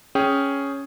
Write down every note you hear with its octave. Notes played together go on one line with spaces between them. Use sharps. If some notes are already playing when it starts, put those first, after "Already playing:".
C#4 G#4 G5